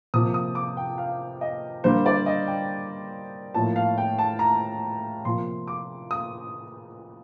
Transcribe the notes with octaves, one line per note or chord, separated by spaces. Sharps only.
C3 F3 A#3 D#6
D#6
D6
G5
F5
D#5
D3 G3 A#3 C5
D5
D#5
G5
A2 F3 A#3 A5
F5
G5
A5
A#5
C3 F3 A#3 C6
D6
D#6